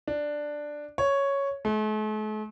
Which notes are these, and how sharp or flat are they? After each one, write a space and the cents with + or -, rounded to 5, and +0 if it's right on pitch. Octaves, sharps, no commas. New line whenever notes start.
D4 +5
C#5 +0
A3 -45